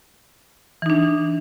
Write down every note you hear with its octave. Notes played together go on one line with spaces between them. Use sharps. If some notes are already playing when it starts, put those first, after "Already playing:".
E3 D4 D#4